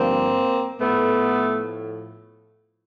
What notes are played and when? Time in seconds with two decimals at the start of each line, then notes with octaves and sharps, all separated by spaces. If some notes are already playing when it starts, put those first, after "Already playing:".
Already playing: G2 D3 F3 A#3 C4
0.80 A2 F3 A3 B3